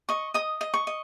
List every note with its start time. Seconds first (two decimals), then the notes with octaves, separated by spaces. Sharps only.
0.09 D#5 C#6
0.34 D#5 D#6
0.61 D#5
0.74 C#6
0.87 D#5